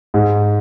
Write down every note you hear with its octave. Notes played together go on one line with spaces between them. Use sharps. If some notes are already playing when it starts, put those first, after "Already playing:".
G#2